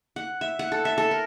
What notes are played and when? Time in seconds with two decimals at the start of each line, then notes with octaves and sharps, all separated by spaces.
0.16 F#5
0.41 E5
0.59 F#5
0.72 A4
0.85 E5
0.98 A4
1.11 A#4